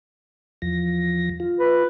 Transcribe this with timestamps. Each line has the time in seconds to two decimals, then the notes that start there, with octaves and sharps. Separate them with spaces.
0.62 E2 F3 A#6
1.40 F4
1.60 B4